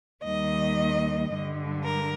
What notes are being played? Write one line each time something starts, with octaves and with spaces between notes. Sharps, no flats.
D#2 D#3 G3 D#5
G2 D3 G3
A#4